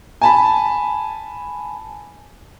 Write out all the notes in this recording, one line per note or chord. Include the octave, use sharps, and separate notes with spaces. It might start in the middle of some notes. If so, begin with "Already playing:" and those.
G#5 A5 B5